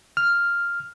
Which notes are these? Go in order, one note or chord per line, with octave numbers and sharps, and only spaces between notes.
F6